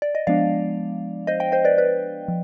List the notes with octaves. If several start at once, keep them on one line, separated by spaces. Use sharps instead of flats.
D5
D#5
F3 G#3 B3 D4 D5 F5
C5 D#5
D#5 G5
C5 D#5
B4 D5
B4 D5
F3